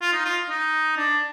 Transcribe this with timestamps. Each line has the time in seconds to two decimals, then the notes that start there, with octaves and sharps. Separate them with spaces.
0.02 F4
0.13 D#4
0.25 F4
0.49 D#4
0.97 D4